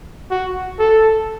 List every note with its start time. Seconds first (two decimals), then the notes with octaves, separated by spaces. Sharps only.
0.31 F#4
0.79 A4